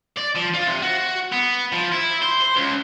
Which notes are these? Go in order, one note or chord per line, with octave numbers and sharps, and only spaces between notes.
D5
F3
F4
C3
F#4
B3
F3
E4
C5
C5
C#2